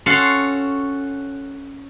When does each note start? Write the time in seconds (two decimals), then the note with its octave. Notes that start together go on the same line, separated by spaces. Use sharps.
0.06 C#4 F#4 A4 F5 C6